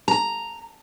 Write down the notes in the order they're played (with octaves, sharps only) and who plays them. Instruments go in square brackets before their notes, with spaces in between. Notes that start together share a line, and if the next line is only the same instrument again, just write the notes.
[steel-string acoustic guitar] A#5